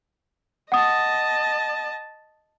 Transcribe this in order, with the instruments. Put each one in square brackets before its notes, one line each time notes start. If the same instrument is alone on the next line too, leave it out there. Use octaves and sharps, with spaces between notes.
[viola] D#5 A5 [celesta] F#5 D#6